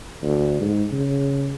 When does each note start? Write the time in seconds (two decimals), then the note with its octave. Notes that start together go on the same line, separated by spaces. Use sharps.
0.22 D2
0.61 G#2
0.92 C#3